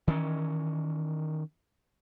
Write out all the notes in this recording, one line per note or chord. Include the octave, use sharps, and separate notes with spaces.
D#3 E3 C#4